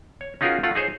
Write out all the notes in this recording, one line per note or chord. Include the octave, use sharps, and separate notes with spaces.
C#5
C#4 D#4 F4 F#4 G#4 A#4
A3 F4 F#5
D#4 G#4 C5 C#5